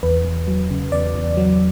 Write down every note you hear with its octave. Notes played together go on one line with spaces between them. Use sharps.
E2 B4
E2
F#3
C#3
E2 D5
E2
F#3